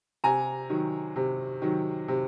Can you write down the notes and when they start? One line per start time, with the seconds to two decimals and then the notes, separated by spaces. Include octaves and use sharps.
0.24 C3 G#5 A#5
0.70 D#3 F#3
1.16 C3
1.62 D#3 F#3
2.08 C3